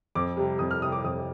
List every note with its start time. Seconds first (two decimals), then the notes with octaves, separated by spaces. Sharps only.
0.15 F2 D6
0.37 C3 G3
0.59 F2 D#6
0.71 F6
0.81 C3 G3 D#6
0.92 D6
1.04 F2 D#6